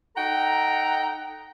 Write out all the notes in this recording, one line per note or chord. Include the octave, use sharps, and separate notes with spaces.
D#4 A4 F#5 G5 A#5